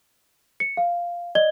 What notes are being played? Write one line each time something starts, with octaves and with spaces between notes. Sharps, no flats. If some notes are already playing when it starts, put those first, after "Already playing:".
C#7
F5
D5 D#5 G#6 G7